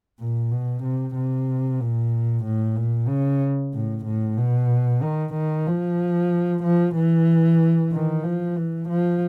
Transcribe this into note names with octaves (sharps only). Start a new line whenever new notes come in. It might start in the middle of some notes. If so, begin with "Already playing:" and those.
A#2
B2
C3
C3
A#2
A2
A#2
C#3
A2
A2
B2
D#3
D#3
F3
F3
E3
D#3
F3
E3
F3